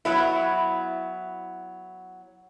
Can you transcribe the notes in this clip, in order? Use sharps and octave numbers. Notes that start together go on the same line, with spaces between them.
F#3 B3 E4